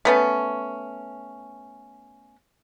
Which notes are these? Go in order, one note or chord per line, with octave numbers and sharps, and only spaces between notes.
A3 B3 C#4